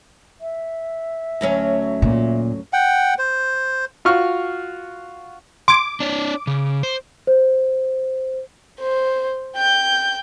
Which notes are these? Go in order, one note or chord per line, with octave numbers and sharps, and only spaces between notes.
E5
D2 F#3 C#4
A#2
F#5 G5
C5
F4 F#4 C#6 F6
C6 D6 G#6
D4 C#5 D5
C#3
C5
C5
C5
G5 G6